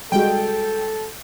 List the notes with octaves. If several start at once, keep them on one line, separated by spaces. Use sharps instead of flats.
G3 G#3 F#4 A4 G5